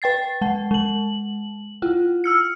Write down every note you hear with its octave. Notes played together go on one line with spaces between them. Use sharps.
B4 G5 A6 C7
G#3 F#5
G#3 F#7
E4 F4
E6 F6 C#7